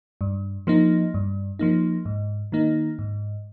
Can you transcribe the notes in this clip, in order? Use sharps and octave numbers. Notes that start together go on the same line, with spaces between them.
G2
F3 A#3 D#4
G2
F3 A#3 D#4
G#2
D#3 A#3 D#4
G#2